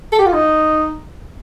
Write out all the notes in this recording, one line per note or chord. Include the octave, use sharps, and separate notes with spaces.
A4
G4
F4
D#4